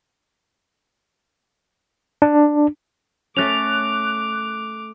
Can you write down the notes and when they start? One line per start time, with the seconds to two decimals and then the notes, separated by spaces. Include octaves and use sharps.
2.22 D4
3.36 A3 C#4 D6 F#6 F7